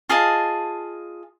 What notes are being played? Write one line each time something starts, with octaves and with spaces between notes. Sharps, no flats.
F4 G#4 D#5 A5